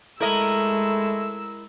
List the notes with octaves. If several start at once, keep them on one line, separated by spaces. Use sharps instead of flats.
G#3 A3 E4 A#4 D#5 E6